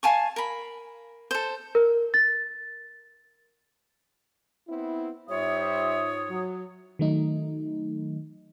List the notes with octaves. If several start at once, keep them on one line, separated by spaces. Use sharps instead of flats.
F5 G#5 A5 C#6
A#4 B5
A4 C5
A#4
A6
B3 C4 E4
G#2 G3 F4 C5 C#5 E5 D#6
F#3
D#3 F#3 A3 D#4